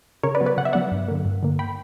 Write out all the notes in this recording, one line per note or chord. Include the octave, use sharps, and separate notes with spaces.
C#3 A#4 C#5
B4 D5
F#3 B3
B4 D5
C#3 F#5
E5
F#3 B3 D5 F#5
G2
D3 A#3
G2
D3 A#3
G5 B5